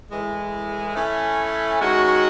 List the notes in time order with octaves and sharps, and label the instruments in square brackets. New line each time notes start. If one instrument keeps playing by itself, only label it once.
[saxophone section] A2 E3 G#3
E3 A3 C#4
D#3 G#3 C#4 F#4